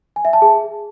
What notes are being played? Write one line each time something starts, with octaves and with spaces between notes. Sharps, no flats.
G#5
E5
A5
G#4